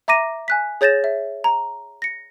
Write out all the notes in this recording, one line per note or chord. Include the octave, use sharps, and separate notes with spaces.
E5 A#5 D6 A#6 D#7
G#5 F#6 B6
G#4 C#5 G6 A6 A#6 E7
E5
A#5
A#6 C#7